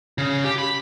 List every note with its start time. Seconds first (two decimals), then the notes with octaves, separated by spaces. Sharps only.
0.18 C#3
0.44 G4
0.58 B5